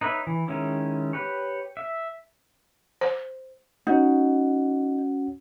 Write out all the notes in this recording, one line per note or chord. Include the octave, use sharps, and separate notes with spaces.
D#4 B4 C#5 E5
E3
D#3 G#3 C#4 E4
G4 B4 C#5
E5
C5
C#4 D#4 F#4 F#5